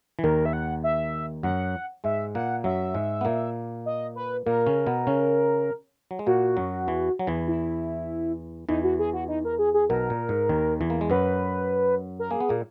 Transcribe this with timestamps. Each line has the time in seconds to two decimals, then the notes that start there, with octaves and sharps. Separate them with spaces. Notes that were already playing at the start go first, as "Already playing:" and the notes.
0.19 E3
0.23 D#2 D#3 A#4
0.46 E5
0.53 F#5
0.84 E5
1.43 F#2 F#3 F#5
2.04 G#2 G#3 E5
2.34 A#2 A#3 F#5
2.64 F#2 F#3 E5
2.94 G#2 G#3
3.21 B3
3.25 A#2 A#3
3.86 D#5
4.16 B4
4.46 A#2 A#3 A#4
4.66 C#3 C#4
4.87 B2 B3
5.07 C#3 C#4
6.11 F#3
6.19 G#3
6.27 A#2 A#3 F#4
6.57 F#2 F#3
6.88 E2 E3
7.19 F#3
7.27 E2 E3
7.48 E4
8.69 E2 E3 D#4
8.84 F#4
8.99 G#4
9.14 F#4
9.28 D#4
9.45 A#4
9.59 G#4
9.74 G#4
9.89 B1 B2 A#4
10.10 A#2
10.29 G#2
10.49 D#2 D#3
10.81 E2 E3
10.90 A#3
11.01 G#3
11.10 F#2 F#3 B4
12.19 A#4
12.31 A#3 G#4
12.40 B3
12.49 A#2 A#3